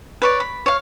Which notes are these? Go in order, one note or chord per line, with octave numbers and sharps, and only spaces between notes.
B4 C#5 D5
B5
C#5 F5